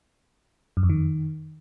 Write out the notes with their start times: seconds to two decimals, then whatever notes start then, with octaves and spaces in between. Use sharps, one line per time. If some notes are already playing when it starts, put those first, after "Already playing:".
0.77 F#2
0.83 F2
0.89 D#3